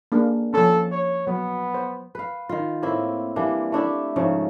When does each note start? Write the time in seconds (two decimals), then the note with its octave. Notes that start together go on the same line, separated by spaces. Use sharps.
0.12 A#3 D4 G#4
0.54 F3 C#4 A4
0.92 C#5
1.27 F#3 B3
1.74 C5
2.15 B4 F5
2.49 D#3 F4
2.82 A2 A#3 C4 E4
3.36 E3 G3 A#3 D4
3.72 A3 D4 E4 G4
4.16 G#2 C#3 F3 A3